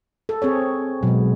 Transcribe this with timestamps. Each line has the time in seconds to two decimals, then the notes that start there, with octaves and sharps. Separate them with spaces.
0.29 A4
0.42 C4 G#4 C#5
1.03 B2 F#3 G#3